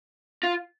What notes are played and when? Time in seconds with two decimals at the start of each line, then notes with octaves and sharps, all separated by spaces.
0.43 F4